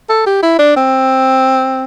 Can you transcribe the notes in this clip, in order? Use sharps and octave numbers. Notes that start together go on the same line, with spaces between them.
A4
G4
E4
D4
C4